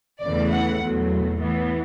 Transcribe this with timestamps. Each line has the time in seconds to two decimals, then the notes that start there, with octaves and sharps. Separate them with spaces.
0.22 E2 C#3 E3 A3 D5
0.51 F#5
0.80 E2 B2 F#3 A3
1.38 A2 E3 B3